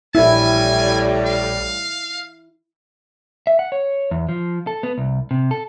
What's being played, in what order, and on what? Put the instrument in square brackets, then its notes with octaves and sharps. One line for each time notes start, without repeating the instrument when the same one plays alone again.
[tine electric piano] A#1 E5 [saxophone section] A2 G3 [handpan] E4 [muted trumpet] G#5
[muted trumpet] F5
[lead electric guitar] E5
F#5
C#5
E2
F3
A4
B3
C2
C3
A4